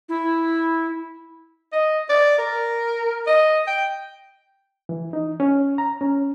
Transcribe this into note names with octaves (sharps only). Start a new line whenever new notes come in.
E4
D#5
D5
A#4
D#5
G5
E3
D#4
C#4
A#5
C#4